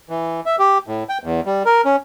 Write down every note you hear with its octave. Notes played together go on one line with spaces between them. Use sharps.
E3
E5
G4
A2
G5
E2
G3
A#4
C#4